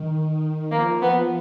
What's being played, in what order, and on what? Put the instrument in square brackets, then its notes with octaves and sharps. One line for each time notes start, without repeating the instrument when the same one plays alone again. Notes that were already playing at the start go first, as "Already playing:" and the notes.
Already playing: [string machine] D#3
[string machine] F3 [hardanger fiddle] A#3
[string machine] F3 [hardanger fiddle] B3